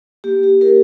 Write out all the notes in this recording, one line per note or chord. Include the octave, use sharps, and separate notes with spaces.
A#3 G4
G4
E4 G4 A#4